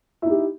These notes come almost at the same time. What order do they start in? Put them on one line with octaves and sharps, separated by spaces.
E4 D#4 G4